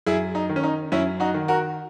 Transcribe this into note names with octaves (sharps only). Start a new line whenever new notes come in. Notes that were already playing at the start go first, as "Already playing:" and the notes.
F#2 E4 G#4
D#4
D#3
C#4
D#4
F#2 C#4 E4
D#4 F#4
D#3
F#4 A#4